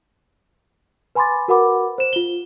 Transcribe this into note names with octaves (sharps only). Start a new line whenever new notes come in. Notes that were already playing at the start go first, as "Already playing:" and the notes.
B4 G#5 B5 C6 D6 A6
F#4 A#4 B4 F#5 B5 D6
C5 E7
F4 G7